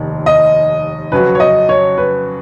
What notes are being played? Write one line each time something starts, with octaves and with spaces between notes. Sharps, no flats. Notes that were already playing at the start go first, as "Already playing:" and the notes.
Already playing: F1 D#2 D#3
D#5
F2 C#3 F#3 C#4 F#4 B4
C#5
D#5
C#5
B4